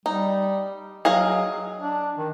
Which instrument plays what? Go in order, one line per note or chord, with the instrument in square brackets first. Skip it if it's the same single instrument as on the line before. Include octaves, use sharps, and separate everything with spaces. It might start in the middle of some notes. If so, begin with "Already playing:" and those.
[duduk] G3 [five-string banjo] D#4
[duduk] F#3 [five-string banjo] G#4 D#5 F5
[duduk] D4
D#3